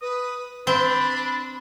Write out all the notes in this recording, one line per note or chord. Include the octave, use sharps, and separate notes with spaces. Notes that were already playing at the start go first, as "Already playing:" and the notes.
B4 D#6
C4 D4 B5